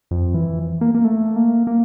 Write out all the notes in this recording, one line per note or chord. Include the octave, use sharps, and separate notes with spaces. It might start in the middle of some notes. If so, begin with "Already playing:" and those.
F2
E3
A#3
A#3
A3
A#3
A#3